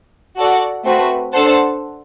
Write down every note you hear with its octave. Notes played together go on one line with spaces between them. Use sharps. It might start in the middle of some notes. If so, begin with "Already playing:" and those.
F#4 A4 D5 F#5
A3 C4 F#4 B4
D4 A4 C5 F#5 A5